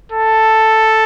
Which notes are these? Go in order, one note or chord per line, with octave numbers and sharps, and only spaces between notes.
A4